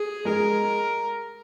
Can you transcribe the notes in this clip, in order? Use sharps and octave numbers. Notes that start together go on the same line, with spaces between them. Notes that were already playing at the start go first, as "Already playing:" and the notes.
Already playing: G#4
G#3 A#4